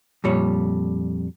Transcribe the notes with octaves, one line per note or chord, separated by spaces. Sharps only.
F2 A#2 G3 C#5